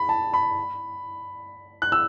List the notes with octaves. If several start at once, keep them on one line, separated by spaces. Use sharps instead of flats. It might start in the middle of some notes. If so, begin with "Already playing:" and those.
Already playing: B5
A5
B5
F#6
E6